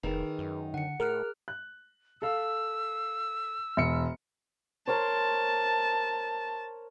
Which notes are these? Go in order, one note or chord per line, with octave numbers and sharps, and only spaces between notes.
F1 D#3 G#4 A#4 B4
F#2
D3 F#5 C#7
A2 G#4 A#4 F6 F#6
F#6
A4 F5 E6
E1 C#7
A#4 C5 C#5 A5